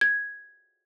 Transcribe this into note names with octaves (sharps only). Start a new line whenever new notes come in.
G#6